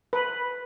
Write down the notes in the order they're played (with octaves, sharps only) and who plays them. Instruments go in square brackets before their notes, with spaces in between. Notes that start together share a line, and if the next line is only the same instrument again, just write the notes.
[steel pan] B4